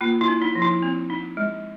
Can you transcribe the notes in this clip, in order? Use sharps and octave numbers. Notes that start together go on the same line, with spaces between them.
A#3 F4
E4
D4
D#4
F3
E4
C4
D#4
G#3